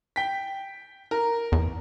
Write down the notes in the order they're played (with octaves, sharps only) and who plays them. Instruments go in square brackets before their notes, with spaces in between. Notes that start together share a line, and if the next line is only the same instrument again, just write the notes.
[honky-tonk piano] G5 B6
A#4
[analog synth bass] E2